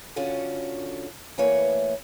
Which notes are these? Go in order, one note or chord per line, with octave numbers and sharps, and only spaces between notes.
D3 C#4 F4 F#4
E3 A3 A#3 B4 C#5